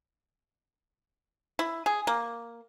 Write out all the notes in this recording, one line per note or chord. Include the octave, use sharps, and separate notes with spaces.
E4
G#4
A#3